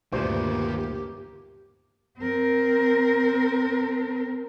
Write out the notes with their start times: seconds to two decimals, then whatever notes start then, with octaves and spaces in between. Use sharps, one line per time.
0.12 D2 G2 A#2 D#3 A#3 B3 G4 C5
2.19 C4 A#4